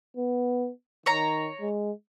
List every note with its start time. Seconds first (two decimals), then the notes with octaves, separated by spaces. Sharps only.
0.17 B3
1.06 D#3 C#5 A#5
1.61 G#3